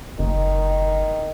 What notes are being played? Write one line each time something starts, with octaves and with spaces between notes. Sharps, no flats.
F#1 D#3